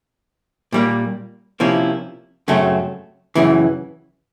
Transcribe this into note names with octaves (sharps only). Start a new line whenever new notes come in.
A#2 G3 A#3
C3 F3 A#3 C#4 E4
F#2 C#3 F#3 A3 C4
F#2 C#3 E3